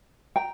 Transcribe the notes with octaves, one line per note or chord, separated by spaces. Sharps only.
G5 A#5